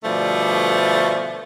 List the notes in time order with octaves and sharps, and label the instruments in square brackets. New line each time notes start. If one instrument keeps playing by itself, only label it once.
[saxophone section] B2 D3 F3 G3 A3